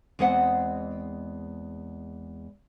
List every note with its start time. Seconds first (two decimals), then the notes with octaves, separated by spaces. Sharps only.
0.19 E2 G#3 C4 D#5 F#5